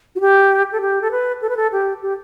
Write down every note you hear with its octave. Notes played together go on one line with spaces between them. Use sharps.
F#4
G4
A4
G4
A4
B4
A4
B4
A4
G4
G4